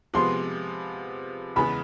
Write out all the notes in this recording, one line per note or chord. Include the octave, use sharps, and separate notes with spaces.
C3 F3 G#3 B3 C6
E2 C#3 E3 G#3 B3 B5